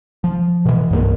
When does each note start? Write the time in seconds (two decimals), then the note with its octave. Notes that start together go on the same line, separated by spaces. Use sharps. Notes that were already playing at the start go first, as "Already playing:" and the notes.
0.24 F3
0.65 B2 E3
0.91 C2 G2 G3 A#3